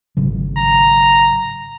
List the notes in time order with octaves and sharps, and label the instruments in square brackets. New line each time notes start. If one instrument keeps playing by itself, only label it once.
[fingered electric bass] G#1 C#3 F#3
[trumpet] A#5